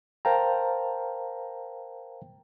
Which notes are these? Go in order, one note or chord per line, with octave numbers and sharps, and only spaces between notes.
A#4 C5 F5 G5 A5 A#5